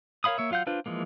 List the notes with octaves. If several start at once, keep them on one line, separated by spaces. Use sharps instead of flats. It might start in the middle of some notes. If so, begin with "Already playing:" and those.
A#4 C#5 F5 B5 D#6
A#3 C#5 E5
F#3 F4 F5 F#5 G6
D4 F4 B4 C5
E3 F3 G#3 A#3